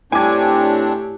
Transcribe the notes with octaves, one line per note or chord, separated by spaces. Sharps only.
A2 C4 D4 G4 C#5 G#5 D6 G#6